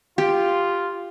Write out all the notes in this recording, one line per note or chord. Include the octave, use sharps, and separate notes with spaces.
F4 G4